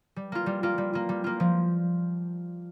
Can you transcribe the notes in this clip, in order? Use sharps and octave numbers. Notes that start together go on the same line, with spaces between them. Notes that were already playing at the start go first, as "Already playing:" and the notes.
G3
A#3 F4
G3
A#3 F4
G3
A#3 F4
G3
A#3 F4
F3